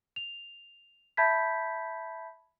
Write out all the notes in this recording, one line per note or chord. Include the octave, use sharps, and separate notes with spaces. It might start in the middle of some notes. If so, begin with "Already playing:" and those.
F7
E5 A5 B5 G6 G#6 B6